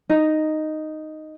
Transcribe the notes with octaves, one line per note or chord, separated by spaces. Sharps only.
D#4